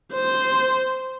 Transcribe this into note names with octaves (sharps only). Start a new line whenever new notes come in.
C5